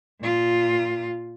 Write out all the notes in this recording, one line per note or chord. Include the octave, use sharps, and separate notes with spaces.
A#2 F4